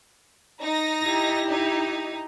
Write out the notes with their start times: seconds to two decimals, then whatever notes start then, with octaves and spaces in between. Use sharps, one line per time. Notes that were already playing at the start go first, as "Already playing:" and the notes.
0.62 D#4 A#6
1.04 E4 G4
1.49 D#4